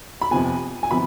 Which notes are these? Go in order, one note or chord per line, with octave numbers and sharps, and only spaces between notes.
B5
F2 C3 F3 B3 G#5
G#5
C3 F3 B3 B5